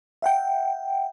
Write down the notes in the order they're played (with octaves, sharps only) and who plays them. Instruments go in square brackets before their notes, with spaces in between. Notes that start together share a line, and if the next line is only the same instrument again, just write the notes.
[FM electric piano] E5 F#5 G5